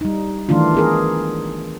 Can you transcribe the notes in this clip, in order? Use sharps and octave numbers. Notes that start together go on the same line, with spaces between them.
G3 D#4
D#3 E3 A3 D4 F4
B3 G#4 A#4